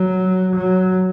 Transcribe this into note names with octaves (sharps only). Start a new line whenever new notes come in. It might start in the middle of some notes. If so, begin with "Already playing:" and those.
Already playing: F#3
F#3